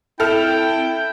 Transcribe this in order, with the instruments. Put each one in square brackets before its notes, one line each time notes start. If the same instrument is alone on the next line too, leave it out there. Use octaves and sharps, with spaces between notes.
[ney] C4 [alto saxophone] E4 [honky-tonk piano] A4 F6 F7 [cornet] G5